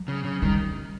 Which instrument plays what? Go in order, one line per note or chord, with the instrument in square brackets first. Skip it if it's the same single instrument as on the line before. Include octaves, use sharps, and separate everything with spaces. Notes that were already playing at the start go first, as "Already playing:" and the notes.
Already playing: [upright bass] F#3
[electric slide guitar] C#3
C#3
[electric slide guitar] D#3 [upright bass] G3